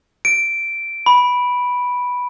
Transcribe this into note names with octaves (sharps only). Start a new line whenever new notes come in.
D7
B5